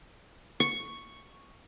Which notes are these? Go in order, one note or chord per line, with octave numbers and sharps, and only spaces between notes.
C#6